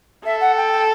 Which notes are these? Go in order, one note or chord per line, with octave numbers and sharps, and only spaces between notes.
A4 E5
F#5
G5
G5